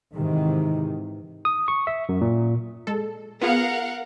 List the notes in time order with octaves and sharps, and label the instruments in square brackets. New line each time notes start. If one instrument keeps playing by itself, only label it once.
[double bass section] G#2 C3 D#3 E3
[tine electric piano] D#6
C#6
E5
F#2
A#2
[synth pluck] G#3 A4
[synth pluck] B3 F4 G#4 [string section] A#4 F5 F#5